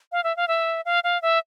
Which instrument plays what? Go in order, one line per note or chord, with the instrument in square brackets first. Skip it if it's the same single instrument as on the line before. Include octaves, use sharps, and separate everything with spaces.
[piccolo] F5
E5
F5
E5
F5
F5
E5